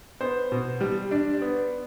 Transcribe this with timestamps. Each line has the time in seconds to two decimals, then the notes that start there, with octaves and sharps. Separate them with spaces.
0.21 B3 C5
0.52 B2
0.81 G3
1.11 D4
1.42 B3